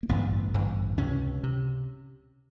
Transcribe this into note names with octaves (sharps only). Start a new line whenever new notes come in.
A#3
A1 G2 D3 B3
A1 G2 D3
C#2 C3 C#4
C3